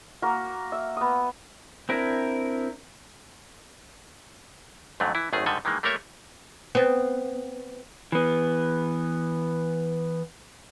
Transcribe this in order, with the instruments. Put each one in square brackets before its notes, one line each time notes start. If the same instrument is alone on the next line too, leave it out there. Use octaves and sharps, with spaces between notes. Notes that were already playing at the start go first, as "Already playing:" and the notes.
[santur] A#3 F#4 A#4
E5
B3 D#6
[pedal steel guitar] C4 D4 E4 A#4
[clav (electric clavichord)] F2 G#2 D3 F#3 A3
E3 E4
G#1 F#2 D#3 A3 G#4
G#2 D3 D#3 G3 A4 G#5
D#3 E3 G#3 A#3
G3 A3 A#3 A#4 C#5 E5
[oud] B3 C4
[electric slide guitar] E3 B3